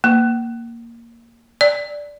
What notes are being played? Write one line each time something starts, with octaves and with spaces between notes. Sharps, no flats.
A#3
D5